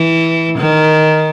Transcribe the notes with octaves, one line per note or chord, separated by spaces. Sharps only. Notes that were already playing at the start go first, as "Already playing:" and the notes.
Already playing: E3
D#3